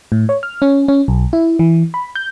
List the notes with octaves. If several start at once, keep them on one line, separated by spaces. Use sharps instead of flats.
A2
C#5
F6
C#4
C#4
B1
E4
E3
B5
G6